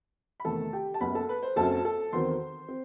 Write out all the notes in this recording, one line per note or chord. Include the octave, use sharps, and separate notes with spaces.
B5
E2 C3 D#3 A3 A4 A5
G4 G5
A5
F#1 F#2 F#3 B3 B4 B5
A4 A5
B4
C5
F#1 F#2 F#3 C4 A4 A5
A4 A5
E2 D#3 F#3 C4 C5 C6
C4